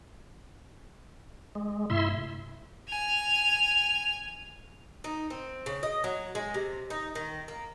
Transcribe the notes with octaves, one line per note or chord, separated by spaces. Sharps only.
G#3
G2 C3 A3 E4 E5 C6
G#5 F7
D#4
C4
C#3
D#5
F#3
G#3
C3
D#4
D#3
A#3